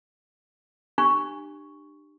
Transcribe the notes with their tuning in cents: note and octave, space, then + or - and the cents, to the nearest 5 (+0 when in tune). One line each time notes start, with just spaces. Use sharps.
D4 +40 G4 +0 C#6 +0